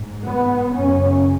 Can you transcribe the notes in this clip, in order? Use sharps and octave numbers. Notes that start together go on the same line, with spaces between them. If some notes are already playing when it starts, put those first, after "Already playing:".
Already playing: G#2
B3
F#2 C#3 C#4